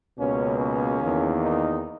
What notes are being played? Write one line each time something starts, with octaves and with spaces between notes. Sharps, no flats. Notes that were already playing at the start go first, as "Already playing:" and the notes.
C#2 B2 A#3 C#4
C#4
E2 D#3 A#3
D#4